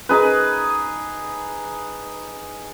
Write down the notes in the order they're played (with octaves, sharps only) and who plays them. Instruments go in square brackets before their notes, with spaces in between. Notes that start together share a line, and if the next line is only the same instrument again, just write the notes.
[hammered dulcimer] D#4 G#4 B4